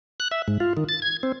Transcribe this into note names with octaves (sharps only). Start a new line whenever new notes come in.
F#6
E5
G#2
F4
D#3
A6
G#6
C4